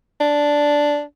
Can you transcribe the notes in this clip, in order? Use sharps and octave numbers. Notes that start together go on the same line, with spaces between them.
D4